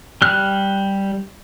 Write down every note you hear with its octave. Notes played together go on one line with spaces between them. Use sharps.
G3 F6 F#6